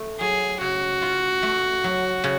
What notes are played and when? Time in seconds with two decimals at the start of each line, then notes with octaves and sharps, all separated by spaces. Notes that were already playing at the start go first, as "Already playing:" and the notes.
Already playing: A3
0.20 F#3 G#4
0.61 C#3 F#4
1.02 F4
1.43 A3
1.84 F#3
2.24 C#3